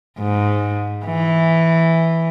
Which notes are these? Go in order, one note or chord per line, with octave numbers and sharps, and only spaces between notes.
G#2
E3